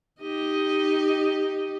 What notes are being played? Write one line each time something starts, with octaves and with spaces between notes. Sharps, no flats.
D#4 G4 D#5